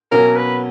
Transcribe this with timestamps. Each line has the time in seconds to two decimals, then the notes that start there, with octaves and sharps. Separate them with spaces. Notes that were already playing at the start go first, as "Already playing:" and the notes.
0.11 B2 F#3 A#3 C#4 A#4
0.36 B4